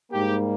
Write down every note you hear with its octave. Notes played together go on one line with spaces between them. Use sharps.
G#2 G3 A#3 G4